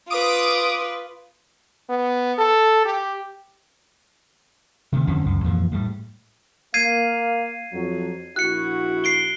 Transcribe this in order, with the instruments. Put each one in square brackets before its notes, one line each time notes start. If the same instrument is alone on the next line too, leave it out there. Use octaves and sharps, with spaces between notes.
[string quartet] F4 B4 [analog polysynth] D6 D#6 D7
[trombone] B3
A4
G4
[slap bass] C3 D#3 A3
F2 D3 C4 C#4
C#2 F#2
F2 A#2 E3 F3
A2 G3
[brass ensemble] A#3 F5 [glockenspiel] G#6 C7 D#7
[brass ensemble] F2 F#3
[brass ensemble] A#1 E4 F#4 [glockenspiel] F#6 C#7
[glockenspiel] C7 D7 G7